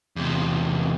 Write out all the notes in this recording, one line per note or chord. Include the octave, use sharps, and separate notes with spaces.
E2 C3